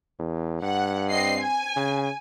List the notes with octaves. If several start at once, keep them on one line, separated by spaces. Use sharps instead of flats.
E2
G2 F#5
C4 D#5 C7
G#5
C#3